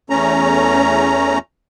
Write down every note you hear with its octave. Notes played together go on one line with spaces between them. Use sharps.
E2 A3 C#4 A#5